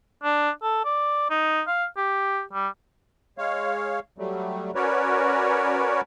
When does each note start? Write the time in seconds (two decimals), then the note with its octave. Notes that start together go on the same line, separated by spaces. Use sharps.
0.24 D4
0.63 A4
0.85 D5
1.30 D#4
1.67 F5
1.97 G4
2.53 G3
3.38 G#3 C#5 F5
4.18 F#3 G3 A3
4.75 C#4 F#4 A#4 B4 C#5 D5